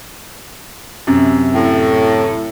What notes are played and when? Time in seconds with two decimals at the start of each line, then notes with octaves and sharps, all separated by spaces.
1.07 F#2 C3
1.54 A2